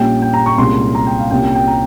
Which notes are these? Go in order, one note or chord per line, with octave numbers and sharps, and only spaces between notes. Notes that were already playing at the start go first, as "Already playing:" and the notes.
Already playing: A#1 A#2 G3 C#4 G5
G5
A#5
C#6
C2 A#2 G#3 C#4 C6
A#5
G5
F5
C2 A#2 G3 C#4 G5
G5
G5
A#5